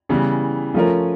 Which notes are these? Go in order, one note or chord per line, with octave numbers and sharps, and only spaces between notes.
C#3 E3 G3 B3 E4
F3 A3 C#4 F4 A#4